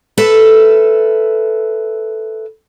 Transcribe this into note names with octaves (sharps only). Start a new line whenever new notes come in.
A4 B4 E5